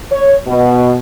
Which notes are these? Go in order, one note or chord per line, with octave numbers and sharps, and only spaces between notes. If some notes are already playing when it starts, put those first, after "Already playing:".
C#5
B2